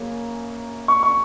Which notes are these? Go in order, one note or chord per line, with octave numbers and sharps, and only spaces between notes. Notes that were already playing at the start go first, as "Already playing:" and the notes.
Already playing: F#2 C#3 A#3 C#4
C#6
C#6